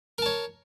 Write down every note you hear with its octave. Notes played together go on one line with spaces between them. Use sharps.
A#4 C#5 A5